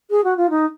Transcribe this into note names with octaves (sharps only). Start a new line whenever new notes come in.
G#4
F#4
F4
D#4